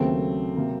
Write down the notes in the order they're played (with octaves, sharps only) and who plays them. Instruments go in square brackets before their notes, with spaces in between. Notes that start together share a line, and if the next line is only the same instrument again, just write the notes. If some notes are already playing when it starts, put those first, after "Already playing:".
Already playing: [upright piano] D#2 C#3 F#3 A3 [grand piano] C4
[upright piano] C3 F#3 A#3